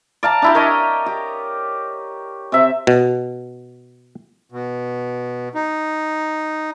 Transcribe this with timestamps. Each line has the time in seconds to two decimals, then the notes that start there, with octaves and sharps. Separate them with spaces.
0.23 D5 F5 A5 A#5
0.42 D4 E4 G4
0.55 A#4 C#5 D#5
1.06 G4
2.52 C3 E5
2.87 B2
4.52 B2
5.55 D#4